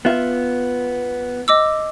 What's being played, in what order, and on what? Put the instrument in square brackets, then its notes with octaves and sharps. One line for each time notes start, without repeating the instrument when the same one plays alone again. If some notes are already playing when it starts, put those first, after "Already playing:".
[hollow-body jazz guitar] B3 F4 E5
[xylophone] D#5 D6 E6